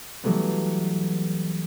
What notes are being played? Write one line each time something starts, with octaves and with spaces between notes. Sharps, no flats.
E3 F#3 G3 A3 B3